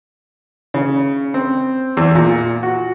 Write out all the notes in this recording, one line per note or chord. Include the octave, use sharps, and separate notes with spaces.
C#3
C4
E2
A#2
F#4